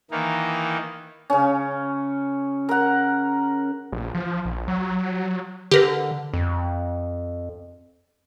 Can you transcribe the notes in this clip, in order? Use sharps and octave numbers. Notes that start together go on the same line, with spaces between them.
D#3 E3 A#3 D#4
C#3 C#4
A#4 F#5
A#1
F3
A#1
F#3
D3 G4 A#4 B4
F2